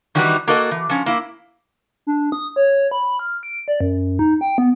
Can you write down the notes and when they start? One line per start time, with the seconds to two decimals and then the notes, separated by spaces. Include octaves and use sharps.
0.15 D#3 E3 G3 D#4 F#4 B4
0.47 A#3 F#4 A4 A#4 D#5
0.71 E3
0.89 F3 C#4
1.06 A#3 E4
2.07 D4
2.32 D#6
2.56 C#5
2.91 B5
3.19 F6
3.43 D7
3.68 D5
3.81 F#2
4.19 D#4
4.41 G5
4.58 B3